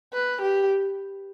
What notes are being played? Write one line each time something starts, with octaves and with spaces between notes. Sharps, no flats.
B4
G4